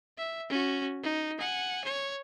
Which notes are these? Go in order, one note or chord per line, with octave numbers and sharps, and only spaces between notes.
E5
C#4 F#4
D#4
F#5 G#5
C#5